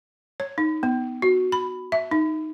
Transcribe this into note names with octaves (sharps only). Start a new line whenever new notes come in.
C#5
D#4
B3
F#4
B5
E5
D#4